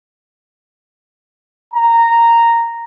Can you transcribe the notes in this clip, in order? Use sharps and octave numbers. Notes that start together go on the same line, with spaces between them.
A#5